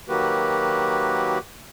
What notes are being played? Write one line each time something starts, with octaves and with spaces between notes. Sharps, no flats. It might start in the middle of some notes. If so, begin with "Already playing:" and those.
D#3 F#3 A#3 F#4 G4 B4